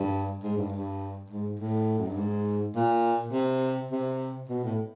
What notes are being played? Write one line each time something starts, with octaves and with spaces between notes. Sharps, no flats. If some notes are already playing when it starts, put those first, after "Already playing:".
Already playing: G2
G#2
G2
G2
G#2
A2
F#2
G2
G#2
A#2
C3
C3
B2
A2